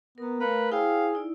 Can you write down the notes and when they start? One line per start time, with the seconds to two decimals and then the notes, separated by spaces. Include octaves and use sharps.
0.18 B3 A#4 A#5
0.41 A3 A#4 B4 C#5 F5
0.72 E4 G#4 C5 F5 G5
1.13 D#4 E4 D5